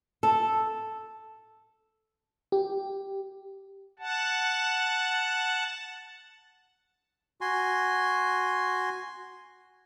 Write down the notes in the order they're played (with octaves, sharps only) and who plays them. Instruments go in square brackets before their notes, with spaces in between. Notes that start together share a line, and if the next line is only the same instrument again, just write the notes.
[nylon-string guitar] A4
[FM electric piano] G4
[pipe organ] F#5 A5
[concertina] F#4 G#5 C6